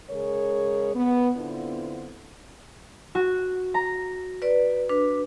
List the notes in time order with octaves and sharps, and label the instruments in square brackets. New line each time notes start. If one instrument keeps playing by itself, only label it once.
[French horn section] C#3 G#3 G#4 A#4 C#5
B3
D3 B3 C4 D4 E4 F4
[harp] F#4
A#5
[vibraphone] B4 D5
D4 B4